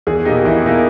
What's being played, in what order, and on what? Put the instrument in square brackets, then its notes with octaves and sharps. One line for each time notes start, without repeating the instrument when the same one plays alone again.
[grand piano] E2 [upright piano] G#4
[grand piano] B2 A#3 D#4 [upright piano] G4
[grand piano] E2 [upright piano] E4
[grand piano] B2 A#3 D#4